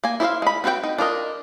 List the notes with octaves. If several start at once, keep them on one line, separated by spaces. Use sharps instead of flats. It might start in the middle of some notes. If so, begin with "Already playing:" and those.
A#3 G#5
E4 C5 D5 E5 F5
G#3 B5
C4 F#4 B4 C5 G5
D#4
D4 F4 A#4 D#5